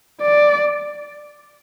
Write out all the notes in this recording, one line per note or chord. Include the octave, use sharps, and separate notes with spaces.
D5